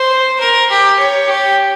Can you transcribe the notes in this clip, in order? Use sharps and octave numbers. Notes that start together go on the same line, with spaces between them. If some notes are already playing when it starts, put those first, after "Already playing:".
Already playing: C5
A#4
G4
C#5
G4